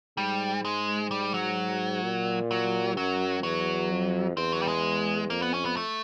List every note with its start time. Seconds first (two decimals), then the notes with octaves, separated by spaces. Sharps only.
0.17 G#2 G3
0.65 G#3
1.11 G3
1.34 F#3
2.03 A#2
2.51 F#3
2.97 F#2 F#3
3.43 E2 F#3
3.91 F2
4.37 E2 C4
4.52 F#3
4.62 G3
4.68 G#3
5.30 F2 A#3
5.42 B3
5.54 C#4
5.65 B3
5.77 A3